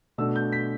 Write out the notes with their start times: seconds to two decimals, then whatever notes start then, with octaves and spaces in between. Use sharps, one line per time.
0.18 B2 A3 D4 E6
0.36 G6
0.52 B6